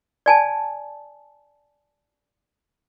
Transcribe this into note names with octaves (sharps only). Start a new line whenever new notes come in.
D5 G#5 A5